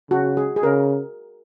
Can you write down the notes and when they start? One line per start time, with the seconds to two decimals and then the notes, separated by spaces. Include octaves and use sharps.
0.10 C#3 F#4
0.37 G#4
0.56 G#4
0.63 C#3 A#4